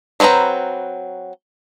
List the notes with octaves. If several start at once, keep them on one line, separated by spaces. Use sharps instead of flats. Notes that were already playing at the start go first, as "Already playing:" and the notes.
F#3 A3 C4 B4 A#5